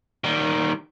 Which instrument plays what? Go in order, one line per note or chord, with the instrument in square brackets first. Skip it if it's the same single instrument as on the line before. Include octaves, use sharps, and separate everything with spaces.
[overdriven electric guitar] D#3 G3